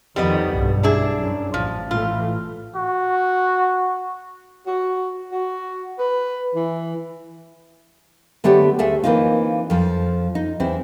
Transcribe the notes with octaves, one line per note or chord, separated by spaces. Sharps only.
F2 D#3 G3 B3 D#5
B1 G2
D4 E4 G#4
F#2
A1 F3
A2 E3 A3 F4
F#4
F#4
F#4
B4
E3
D3 A3 B3 G4 C#5 D5
D2 A3 G#4 E5
E3 A#3 C4 D#4 F4
F2 F3
D#4
E2 C4 E4